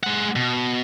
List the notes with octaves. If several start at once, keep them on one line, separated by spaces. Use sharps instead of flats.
G#3 F#5
B2